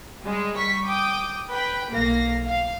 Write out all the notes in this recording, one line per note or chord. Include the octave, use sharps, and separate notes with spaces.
G3 G#3
G3 C#6 B6
G5 D6 D#6
B4 G5 B5
B1 A#3 F5 A#6
F5